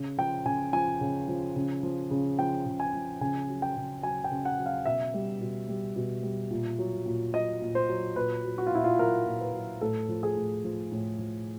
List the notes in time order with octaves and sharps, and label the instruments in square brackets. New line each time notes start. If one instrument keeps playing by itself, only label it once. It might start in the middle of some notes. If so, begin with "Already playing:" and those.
Already playing: [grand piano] C#3
F3 G5
C#3 G#5
F3 G#5
C#3
F3
C#3
F3
C#3
F3 G5
C#3
G#5
F3
C#3 G#5
F#3
G5
C#3
F#3 G#5
G5
C#3
F#5
F#3
F5
B2 E5
G3
B2
G3
B2
G3
A#2
F#3
A#2
F#3 D#5
A#2
C5
F#3
A#2 B4
F#3
F#4
F4
A#2 E4
F4
F#3 A#4
A#2
B4
F#3
A2 A4
F3
G#4
A2
F3
A2
F3